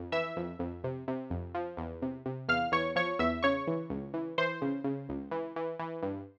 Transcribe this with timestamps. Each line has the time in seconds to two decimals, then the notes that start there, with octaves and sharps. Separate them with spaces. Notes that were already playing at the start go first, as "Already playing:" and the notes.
Already playing: F2
0.12 E3 E5 E6
0.37 F2
0.59 F2
0.84 C3
1.08 C3
1.30 F2
1.55 F3
1.77 E2
2.02 C3
2.26 C3
2.48 E2 F5 F6
2.72 E2 C#5 C#6
2.96 F3 C#5 C#6
3.19 E2 E5 E6
3.43 C#3 C#5 C#6
3.67 E3
3.90 C#2
4.14 E3
4.38 E3 C5 C6
4.62 C#3
4.84 C#3
5.09 C#2
5.31 E3
5.56 E3
5.79 E3
6.02 G2